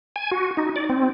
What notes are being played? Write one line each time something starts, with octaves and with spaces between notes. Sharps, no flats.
G#5
F#4
D#4
D5
C4